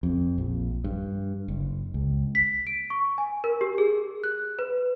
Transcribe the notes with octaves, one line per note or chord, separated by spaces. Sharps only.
F2
A#1
G2
F#1
C#2
B6
D7
C#6
G#5
A#4
G4
G#4
F#6
B4